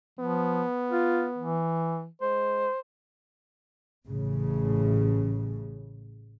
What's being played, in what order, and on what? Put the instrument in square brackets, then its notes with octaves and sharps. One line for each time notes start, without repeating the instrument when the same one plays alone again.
[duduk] F3 [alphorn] B3
[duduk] F4
E3
[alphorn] G#3 [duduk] C5
[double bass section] A1 A2 C#3